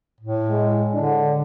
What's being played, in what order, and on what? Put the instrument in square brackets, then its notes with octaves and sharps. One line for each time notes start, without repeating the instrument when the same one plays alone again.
[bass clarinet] A2
[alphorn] G#3
[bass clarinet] D3 [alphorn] D4